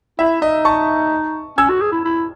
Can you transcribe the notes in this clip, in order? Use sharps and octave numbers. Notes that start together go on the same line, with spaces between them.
E4 E5
D#4 D#5
A5 C#6
C#4 E6 G#6
F#4
G#4
E4
E4